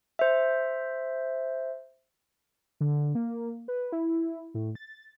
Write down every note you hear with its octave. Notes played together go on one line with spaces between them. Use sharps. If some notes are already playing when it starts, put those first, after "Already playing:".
C5 E5
D3
A#3
B4
E4
A2
A6